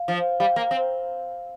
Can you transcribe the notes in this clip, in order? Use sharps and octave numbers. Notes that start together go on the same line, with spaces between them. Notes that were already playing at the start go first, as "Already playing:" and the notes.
Already playing: F5
F3
G3 F5
A#3
C4